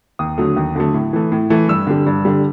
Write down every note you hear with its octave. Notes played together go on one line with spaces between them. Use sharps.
D#2 D#6
D3 F#3 A3
D#2
D3 F#3 A3
A2
E3 A3
A2
E3 A3
G2 E6
D3 G3
G2
D3 G3